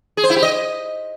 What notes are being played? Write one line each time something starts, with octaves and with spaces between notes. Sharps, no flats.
G#4
C5
E4
G4
D#5